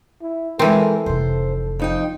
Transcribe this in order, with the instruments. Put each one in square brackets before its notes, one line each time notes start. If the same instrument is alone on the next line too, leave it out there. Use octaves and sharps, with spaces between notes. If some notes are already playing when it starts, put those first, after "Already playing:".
[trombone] E4
[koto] E3 C4 [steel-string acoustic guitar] G#3 A#4 [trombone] A4
[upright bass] F1 C3 [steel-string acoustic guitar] C5
[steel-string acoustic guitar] F2 D#4 G5